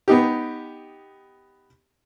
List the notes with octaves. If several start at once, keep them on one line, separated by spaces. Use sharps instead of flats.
B3 D#4 G4